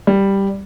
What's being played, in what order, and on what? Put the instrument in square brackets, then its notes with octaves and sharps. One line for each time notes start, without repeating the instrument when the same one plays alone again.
[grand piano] G3